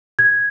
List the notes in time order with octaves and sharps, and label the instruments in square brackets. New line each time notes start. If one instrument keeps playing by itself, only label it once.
[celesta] G#6